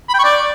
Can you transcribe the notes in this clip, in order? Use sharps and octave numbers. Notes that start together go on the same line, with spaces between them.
B5
G5
C#6
D5